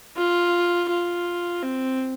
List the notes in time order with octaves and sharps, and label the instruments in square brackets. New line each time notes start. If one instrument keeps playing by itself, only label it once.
[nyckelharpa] F4
F4
C4